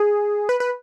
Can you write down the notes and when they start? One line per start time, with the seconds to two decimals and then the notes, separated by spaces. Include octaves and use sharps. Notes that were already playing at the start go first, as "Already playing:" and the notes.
Already playing: G#4
0.49 B4
0.60 B4